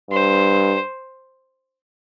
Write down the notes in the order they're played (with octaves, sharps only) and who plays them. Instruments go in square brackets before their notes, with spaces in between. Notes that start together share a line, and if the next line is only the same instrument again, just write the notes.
[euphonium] G2 [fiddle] C5